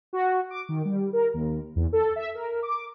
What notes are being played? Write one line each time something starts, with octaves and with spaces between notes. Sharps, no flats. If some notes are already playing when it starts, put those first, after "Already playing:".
F#4
D6
D#3
G3
A#4
D#2
E2
A4
E5
A#4
D6